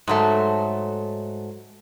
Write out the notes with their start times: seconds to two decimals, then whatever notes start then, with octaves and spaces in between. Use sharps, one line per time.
0.07 G#2 F#3 A3